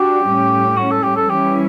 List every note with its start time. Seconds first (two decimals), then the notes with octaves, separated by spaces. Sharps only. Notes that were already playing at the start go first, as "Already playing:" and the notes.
Already playing: D4 F#4 G4
0.25 A2 G3 C#4
0.77 F#4
0.91 A4
1.03 G4
1.17 A4
1.30 E3 G3 C#4 E4 G4